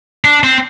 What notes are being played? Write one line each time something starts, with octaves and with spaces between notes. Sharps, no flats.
D4
C4